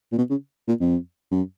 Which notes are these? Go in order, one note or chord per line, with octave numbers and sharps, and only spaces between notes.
A#2
B2
C#3
A#2
F2
F#2